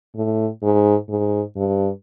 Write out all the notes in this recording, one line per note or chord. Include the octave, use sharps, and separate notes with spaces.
A2
G#2
G#2
G2